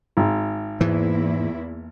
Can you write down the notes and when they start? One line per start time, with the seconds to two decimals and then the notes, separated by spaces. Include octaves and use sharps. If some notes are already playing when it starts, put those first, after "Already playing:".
0.17 G#1
0.81 E2 G#2 E3 A#3 E4